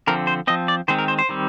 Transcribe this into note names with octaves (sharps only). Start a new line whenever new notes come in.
D3 F3 C4 A#4
C5
F3 C4 D#5
D5
D#3 G#3 C4 C5
A#4
C5
C5
D#3 G3 C4